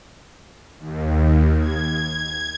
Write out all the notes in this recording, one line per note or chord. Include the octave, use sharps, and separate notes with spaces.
D#2
G#6